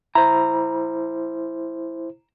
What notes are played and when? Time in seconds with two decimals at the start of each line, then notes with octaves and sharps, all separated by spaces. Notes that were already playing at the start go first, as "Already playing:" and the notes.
0.15 E4 C5 A#5